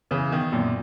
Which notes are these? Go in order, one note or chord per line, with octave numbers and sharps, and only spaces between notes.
C#3 E3
B2 D#3
F#2 A#2